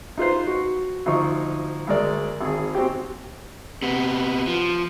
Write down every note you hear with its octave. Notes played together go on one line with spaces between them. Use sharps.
D#4 F4 B4 C5
F#4
D2 F3 D#4 C#6
D2 G#3 A#4 D5
G#1 G#4
C4 F#4 G4
C3 B3
F3